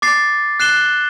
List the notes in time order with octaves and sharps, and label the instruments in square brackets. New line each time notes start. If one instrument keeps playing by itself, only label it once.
[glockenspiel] D6 A6 C7
F#6 C7 E7 G7